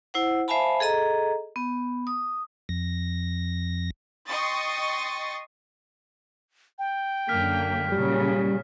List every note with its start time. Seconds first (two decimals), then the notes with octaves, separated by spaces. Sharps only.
0.14 E4 C5 F#5
0.48 C5 E5 F5 G#5 A5 B5
0.80 G#4 A4 D#5 A#5
1.56 B3
2.07 D#6
2.69 F2 A#6
4.28 D#5 G5 C6 C#6 D#6 A6
6.79 G5
7.29 F#2 D3 A#3 F6 B6
7.92 A#2 C#3 F#3 G3